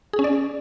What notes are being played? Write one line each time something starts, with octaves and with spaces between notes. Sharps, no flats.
G#4
C#4
D5